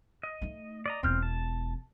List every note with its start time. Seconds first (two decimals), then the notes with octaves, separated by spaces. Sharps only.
0.23 D#5
0.41 A3 D#4
0.86 D5 D#5 A#5
1.03 E1 E2 C4 F6 G6
1.22 A5